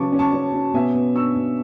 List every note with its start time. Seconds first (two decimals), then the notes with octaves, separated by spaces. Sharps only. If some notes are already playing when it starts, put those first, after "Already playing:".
Already playing: C#3 F#3 C#4 B4 C#5 A5 C#6 D6
0.12 C#4
0.19 A5 C#6
0.33 C#4
0.54 C#4
0.74 B2 E5 G#5
0.94 B2
1.15 D4 C#6 E6
1.35 B2